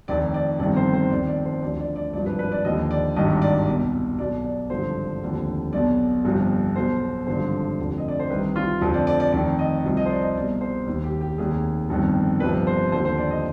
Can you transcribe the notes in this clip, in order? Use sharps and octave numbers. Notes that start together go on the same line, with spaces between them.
F1 F2 D#3 D5
D5
G1 F2 C3 D#3 D5
C5
C5
F1 F2 D#3 D5
D5
C5
D2 D3 F3 D5
D5
D5
G#1 G2 F3 D5
B4
B4
D5
D#2 D3 F3 D#5
D5
G#1 G2 D#3 D#5
D5
C2 B2
B1 B2 D5
D5
G#1 G2 D3 F3 C5
F1 D#2 D3 F3
B1 B2 D5
G1 F2 C3 F3
B1 B2 C5
G#1 G2 D3 F3 C5
F1 F2 D3 F3
D#5
D5
C5
C2 C3 D#3 B4
F4
F1 F2 D3 F3
D5
D5
D5
F1 F2 D#3 D5
D#5
C2 C3 F3
D#5
C5
D5
D#5
C2 B2 D5
C5
F1 D#2 D#3
G4
G4
F1 D#2 D#3 G#4
G1 F2 D#3
G1 F2 C3 F3 B4
C5
D#2 D3 F3 C5
C5
D5
D#5